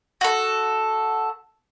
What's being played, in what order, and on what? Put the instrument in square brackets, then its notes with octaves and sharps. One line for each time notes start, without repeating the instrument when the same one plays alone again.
[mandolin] F#4 A4